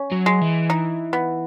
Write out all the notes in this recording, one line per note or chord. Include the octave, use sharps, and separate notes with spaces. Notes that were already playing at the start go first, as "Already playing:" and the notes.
Already playing: C#4
F#3
G#3
E3
D#4
B3